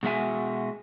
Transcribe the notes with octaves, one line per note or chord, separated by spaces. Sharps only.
B2 G#3 F#4 E5 G#5